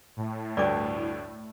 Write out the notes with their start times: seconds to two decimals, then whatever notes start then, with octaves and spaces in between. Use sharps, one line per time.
0.17 A2
0.57 D2 G2 D5 D6